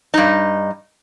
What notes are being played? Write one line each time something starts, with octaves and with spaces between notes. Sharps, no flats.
G2 D#4